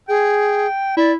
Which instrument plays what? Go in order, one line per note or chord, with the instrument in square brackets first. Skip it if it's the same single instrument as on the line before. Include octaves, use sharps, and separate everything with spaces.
[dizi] G#4 [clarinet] G5
[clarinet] E4 [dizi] D5